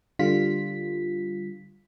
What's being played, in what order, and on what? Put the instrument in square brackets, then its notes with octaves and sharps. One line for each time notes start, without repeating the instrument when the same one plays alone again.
[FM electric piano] D3 G3 F4 B6